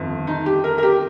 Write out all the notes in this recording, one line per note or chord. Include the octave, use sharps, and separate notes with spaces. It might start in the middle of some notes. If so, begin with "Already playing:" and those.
Already playing: G1 F2 D#3
D#4
G4
A#4
A#4
G4